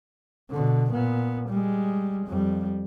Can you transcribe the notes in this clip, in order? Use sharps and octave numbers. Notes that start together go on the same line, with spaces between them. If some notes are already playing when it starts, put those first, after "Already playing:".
B2 D3
A#2 B3
G3 G#3
F2 G3